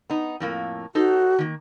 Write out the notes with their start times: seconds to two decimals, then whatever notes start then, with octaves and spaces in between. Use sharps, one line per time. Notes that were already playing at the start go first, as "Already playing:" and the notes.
0.10 B3 D#4
0.40 F2 A2 A#3
0.95 D#4 F#4 A4 C5
1.39 D#3 A#3